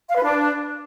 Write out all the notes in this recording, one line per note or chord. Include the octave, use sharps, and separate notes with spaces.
F5
B4
D4